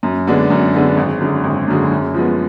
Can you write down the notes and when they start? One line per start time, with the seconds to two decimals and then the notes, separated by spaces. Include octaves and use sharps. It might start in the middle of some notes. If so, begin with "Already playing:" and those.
0.03 F#2
0.27 D3 G#3 B3 D4
0.50 F#2
0.74 D3 G#3 B3 D4
0.97 G#1
1.21 F#2 D3 G#3
1.44 G#1
1.68 F#2 D3 G#3
1.91 F#2
2.14 F3 G#3 B3